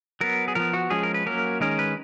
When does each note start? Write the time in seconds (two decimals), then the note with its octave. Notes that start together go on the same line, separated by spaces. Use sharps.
0.21 F#3 B3 A#4
0.48 G#4
0.55 F3 B3 A#4
0.73 F#4
0.90 F3 G#3 C#4 G#4
1.03 A#4
1.14 B4
1.26 F#3 A#3 C#4 A#4
1.60 D#3 G#3 C#4 A#4
1.79 B4